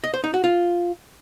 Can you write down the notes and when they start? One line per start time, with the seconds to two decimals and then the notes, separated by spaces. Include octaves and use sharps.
0.04 D#5
0.14 C5
0.24 D#4
0.34 F#4
0.44 F4